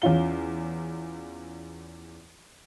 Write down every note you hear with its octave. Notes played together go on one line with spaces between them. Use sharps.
E2 C#4 F4 G7